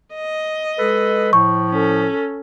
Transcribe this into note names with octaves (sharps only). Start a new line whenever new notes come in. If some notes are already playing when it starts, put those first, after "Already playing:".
D#5
G#3 A4 B4
A2 F3 C#6
C#4 A4